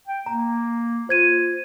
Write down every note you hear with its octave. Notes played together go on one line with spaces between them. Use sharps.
G5
A#3 A#5
F4 C5 G#6 D#7